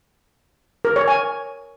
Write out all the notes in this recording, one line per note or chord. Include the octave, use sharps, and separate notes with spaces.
A#4
C#5
G#5